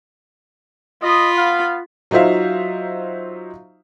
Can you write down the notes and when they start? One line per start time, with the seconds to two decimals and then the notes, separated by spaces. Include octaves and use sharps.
1.03 F4 D#5 B5
1.38 B3 F5
2.11 F#3 D#4 F4 C5 E5 F5